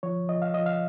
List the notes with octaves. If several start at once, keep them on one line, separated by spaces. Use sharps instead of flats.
F3 C#5
F3 D#5
F5
F3 D#5
F5